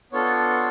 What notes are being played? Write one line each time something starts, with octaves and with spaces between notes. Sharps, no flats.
B3 D4 F4 A4 C#5